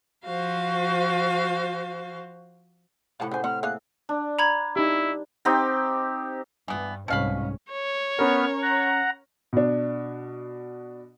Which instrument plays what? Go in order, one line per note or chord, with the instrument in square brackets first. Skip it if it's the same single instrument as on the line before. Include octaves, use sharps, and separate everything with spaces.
[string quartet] F3 F#4 C5 F5
[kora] A2 C3 [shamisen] F5 A5 [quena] F#5
[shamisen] C#3 G#5 [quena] C5 [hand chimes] F#5
[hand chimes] A3 [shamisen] C4 F#5 [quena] F6
[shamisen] A#3 G#4 F5 [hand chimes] E5 [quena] F#6
[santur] D4
[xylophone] A#5 B5 G#6
[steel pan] D#4 G4 [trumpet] E4
[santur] C4 D#4 G4
[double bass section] G2 [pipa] E3 B3
[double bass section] C2 G#2 C#4 [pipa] B2 F5 B5
[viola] C#5
[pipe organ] B3 F6 [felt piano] C#4 A#4
[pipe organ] F#5 A#5
[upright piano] B2 D4